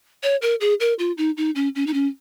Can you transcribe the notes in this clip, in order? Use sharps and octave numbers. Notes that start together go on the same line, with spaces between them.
C#5
A#4
G#4
A#4
F4
D#4
D#4
C#4
C#4
D#4
C#4